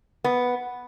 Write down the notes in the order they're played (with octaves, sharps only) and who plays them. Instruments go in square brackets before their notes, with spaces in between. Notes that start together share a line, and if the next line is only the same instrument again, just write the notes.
[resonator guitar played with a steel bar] B3